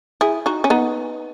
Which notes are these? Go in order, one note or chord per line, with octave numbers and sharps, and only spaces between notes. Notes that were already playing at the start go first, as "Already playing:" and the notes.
E4 G#4
D#4 F#4
C#4
B3 D#4